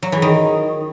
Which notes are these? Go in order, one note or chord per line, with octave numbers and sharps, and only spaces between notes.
F#3
E3
D#3